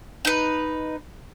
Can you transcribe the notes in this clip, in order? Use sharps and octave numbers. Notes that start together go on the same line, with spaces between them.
D#4 B4